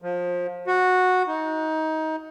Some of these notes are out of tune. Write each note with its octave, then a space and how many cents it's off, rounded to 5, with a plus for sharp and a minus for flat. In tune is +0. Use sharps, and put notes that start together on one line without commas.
F3 +25
F#4 -10
D#4 +20